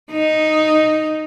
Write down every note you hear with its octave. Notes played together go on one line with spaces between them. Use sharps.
D#4